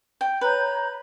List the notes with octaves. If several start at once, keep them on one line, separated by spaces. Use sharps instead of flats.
G5
B4 C#5 A#5 G6